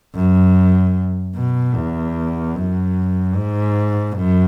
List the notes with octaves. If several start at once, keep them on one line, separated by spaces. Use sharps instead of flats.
F#2
B2
E2
F#2
G#2
F#2